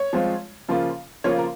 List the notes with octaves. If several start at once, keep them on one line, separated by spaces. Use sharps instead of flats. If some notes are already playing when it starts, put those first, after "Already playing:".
Already playing: C#5
F3 G#3 C4 F4
C#3 F3 A#3 F4
C#3 F3 A#3 F4 C#5
A#4